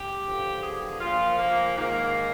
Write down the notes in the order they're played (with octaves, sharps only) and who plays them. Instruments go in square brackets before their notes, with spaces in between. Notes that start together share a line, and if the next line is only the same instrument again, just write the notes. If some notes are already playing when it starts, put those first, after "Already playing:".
Already playing: [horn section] G4
G2 D3 F3
G#4
A#2 F3 F4
A#3
G#2 D#3 A#3